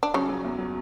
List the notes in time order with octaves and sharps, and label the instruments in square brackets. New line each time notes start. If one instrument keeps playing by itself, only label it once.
[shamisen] D4
[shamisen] C#3 C#4 [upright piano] F#3
[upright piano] F#3
E2
F#3